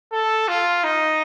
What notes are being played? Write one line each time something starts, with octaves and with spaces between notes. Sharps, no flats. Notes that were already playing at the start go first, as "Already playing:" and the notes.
A4
F4
D#4